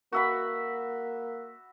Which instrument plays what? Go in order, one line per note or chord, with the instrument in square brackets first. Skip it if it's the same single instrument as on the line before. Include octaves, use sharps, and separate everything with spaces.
[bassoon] A#3 [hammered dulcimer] F#4 E5 B5